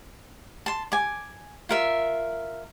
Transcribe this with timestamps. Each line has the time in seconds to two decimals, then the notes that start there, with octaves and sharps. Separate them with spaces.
0.66 A5 C6
0.92 G#5 D6
1.69 F4 A#4 E5